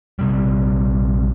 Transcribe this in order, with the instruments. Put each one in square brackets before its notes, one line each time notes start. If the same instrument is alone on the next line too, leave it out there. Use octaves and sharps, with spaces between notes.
[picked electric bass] A#1 C3 G3